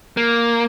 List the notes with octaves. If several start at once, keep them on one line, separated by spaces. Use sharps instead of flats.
A#3